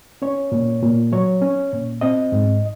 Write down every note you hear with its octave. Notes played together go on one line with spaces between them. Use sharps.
C#4 C#5
A#2
A#2
F#3 C#5
C#4
A#2
C4 D#5
G#2